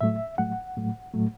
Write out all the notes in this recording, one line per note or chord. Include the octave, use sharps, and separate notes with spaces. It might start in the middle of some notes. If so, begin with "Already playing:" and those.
A2 F#3 A3 E5
A2 F#3 A3 F#5
A2 F#3 A3
A2 F#3 A3